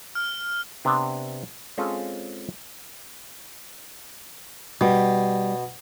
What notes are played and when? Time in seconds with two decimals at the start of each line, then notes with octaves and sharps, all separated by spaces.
0.15 F6
0.85 C3 B3 C4 D4
1.78 G#3 C4 C#4 F4 G#4 A4
4.81 B2 G3